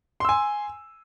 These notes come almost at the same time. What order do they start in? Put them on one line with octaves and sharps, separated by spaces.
C6 E6 G#5